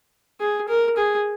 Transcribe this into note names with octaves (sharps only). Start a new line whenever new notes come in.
G#4
A#4
G#4